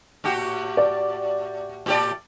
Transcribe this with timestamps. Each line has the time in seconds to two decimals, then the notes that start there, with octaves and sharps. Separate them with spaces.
0.24 A2 F#4 G4
0.77 D5
1.86 A2 G4 D5